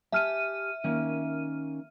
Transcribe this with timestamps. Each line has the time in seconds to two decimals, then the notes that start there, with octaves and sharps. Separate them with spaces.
0.12 G4 E5 G#5 A5 F6 D#7
0.84 D#3 A#3 C#4